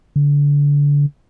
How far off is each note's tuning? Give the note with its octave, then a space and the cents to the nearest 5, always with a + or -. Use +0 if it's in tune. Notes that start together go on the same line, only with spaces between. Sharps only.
D3 -30